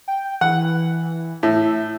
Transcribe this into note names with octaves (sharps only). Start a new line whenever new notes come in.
G5
E3 F#5
A2 E5